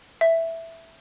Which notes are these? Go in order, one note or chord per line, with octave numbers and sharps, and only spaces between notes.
E5